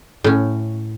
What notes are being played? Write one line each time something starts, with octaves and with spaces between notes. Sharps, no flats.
A2 C#4